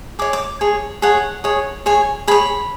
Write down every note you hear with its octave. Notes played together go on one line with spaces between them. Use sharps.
G#4 C#5 D6
D6
G#4 C#5
G#4 C#5 F#5
G#4 C#5
G#4 C#5 G#5
G#4 C#5 B5